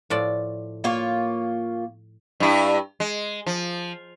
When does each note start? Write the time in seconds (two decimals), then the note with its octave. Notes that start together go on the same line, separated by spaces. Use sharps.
0.10 A2 F3 D5
0.84 A#3 F4 C#5
2.40 G2 E4
3.00 G#3
3.46 F3